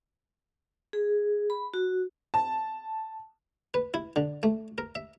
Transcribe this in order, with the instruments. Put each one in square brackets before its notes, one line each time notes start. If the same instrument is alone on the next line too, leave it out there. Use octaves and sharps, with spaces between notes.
[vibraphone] G#4
B5
F#4
[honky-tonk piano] A5
[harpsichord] B4
E4
D3
A3
A#4
E5